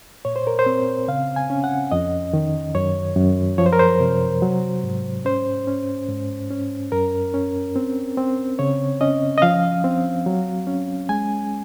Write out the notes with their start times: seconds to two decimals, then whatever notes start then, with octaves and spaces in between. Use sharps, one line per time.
0.25 A#2 C#5
0.36 C5
0.47 A#4
0.59 C5
0.66 C4
1.08 C#3 F5
1.36 G#5
1.50 C#4
1.64 F#5
1.91 F2 D#5
2.33 D#3
2.75 F#2 C#5
3.16 F#2
3.58 F3 C#5
3.66 C5
3.73 A#4
3.79 C5
4.00 C3
4.42 F#3
4.83 G#2
5.25 C#4 C5
5.67 C#4
6.08 G#2
6.51 C#4
6.92 F#2 A#4
7.34 C#4
7.76 C4
8.17 C4
8.59 C#3 C#5
9.01 C#4 D#5
9.38 D#5
9.42 F3 F5
9.84 C4
10.26 F#3
10.67 C#4
11.09 G#3 G#5